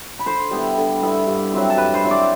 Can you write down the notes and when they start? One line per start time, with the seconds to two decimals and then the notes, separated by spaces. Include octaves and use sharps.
0.19 B5
0.26 D3 C5 C6
0.51 G3 B3 E4
0.77 D3
1.02 G3 B3 E4
1.27 G2
1.52 F#3 C4 E4
1.70 A5
1.77 G2 B4 B5
1.94 C5 C6
2.03 F#3 C4 E4
2.11 D5 D6